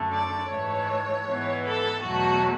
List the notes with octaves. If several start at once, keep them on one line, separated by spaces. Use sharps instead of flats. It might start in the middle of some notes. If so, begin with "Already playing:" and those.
Already playing: F#2 D3 A3
D5
G#2 E3 A3 C#5
G#2 E3 B3
A4
E2 B2 F#3 A3 F#4